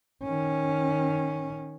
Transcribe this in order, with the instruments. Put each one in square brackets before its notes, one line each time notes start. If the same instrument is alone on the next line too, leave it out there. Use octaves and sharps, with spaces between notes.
[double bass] D#3 C#4